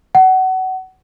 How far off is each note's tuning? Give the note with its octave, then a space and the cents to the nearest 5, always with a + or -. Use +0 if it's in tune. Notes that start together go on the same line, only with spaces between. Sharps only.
F#5 +25